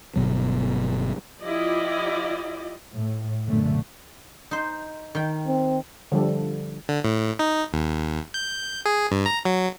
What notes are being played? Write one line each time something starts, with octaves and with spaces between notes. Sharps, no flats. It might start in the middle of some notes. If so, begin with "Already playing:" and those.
G1 C2 B2 F#3
F3 E4 F4 G4 D5 D#5
A2
B1 F#2 A#2 D3 A3
D#4 C5
D#3 G5
C4
D3 F3 G3 A4
D3
A2
D#4
D#2
G6
G#4
G2
A#5
F#3